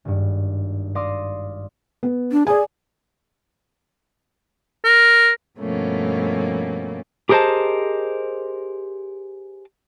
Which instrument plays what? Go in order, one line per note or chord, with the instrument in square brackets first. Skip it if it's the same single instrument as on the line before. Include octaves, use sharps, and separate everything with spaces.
[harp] G#1 G2
D5 F5 C6 D6 D#6 A#6
[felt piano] B3
[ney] D4
[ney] G#4 [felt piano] D5 G#5
[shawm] A#4
[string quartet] G2 B2 F3 A3 A#3 C#4
[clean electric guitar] G4 G#4 A#4 C5 D#5 A5